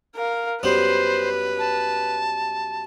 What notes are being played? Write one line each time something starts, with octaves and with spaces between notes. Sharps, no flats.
A#4 F5
F#2 G3 B3 B4 C5
A5